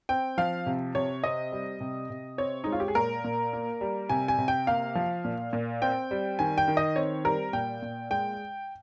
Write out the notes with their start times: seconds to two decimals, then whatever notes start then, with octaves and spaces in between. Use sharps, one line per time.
0.09 C4 G5
0.38 F3 F5
0.66 C3
0.95 C3 C#5
1.23 C4 D#5
1.52 G3
1.80 C3
2.10 C3
2.38 C4 C#5
2.64 G#3 D#4
2.72 F4
2.80 G4
2.88 G#4
2.95 A#2 A#4
3.24 A#2
3.53 A#3
3.81 G3
4.09 C3 G#5
4.28 G#5
4.38 C3
4.48 G5
4.67 A#3 F5
4.95 F3
5.24 A#2
5.53 A#2
5.82 C4 G5
6.11 G3
6.39 D#3 G#5
6.58 G5
6.68 D#3
6.77 D#5
6.96 C4 C#5
7.24 G3 A#4
7.53 A#2 G5
7.82 A#2
8.11 G#3 G5